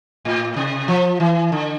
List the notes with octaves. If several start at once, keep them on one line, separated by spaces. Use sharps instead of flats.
A2
C3
F3
E3
D3